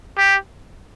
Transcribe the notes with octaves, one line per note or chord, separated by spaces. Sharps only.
G4